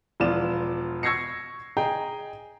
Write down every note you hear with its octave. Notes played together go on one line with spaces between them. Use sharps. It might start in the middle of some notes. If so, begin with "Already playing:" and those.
E1 F3 B3 F4 D5 E7
C#6 E6 G#6 A#6 C7 C#7
G#4 D#5 G5 G#5 A#5